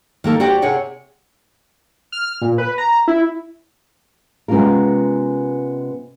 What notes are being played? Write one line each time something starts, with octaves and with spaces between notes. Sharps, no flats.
D#3 A#3 A4
F#4 G4 C5 D5 G5
C3 G#4 C#5 F#5 G5
F6
A#2
B4
A#5
E4
C3 G#3 B3 C#4 F4 A#4